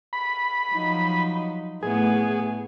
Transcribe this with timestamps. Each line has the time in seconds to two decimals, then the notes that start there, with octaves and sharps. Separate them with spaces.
0.13 B5
0.71 F3 F#3 D#4
1.83 A2 A3 B3 G#4